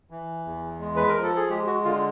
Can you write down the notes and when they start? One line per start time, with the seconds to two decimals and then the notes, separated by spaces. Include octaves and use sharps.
0.10 E3
0.45 E2
0.79 G#3
0.96 B4
1.09 A#4
1.15 F3
1.23 A4
1.36 G#4
1.49 G#3 G4
1.67 F#4
1.85 D3 F4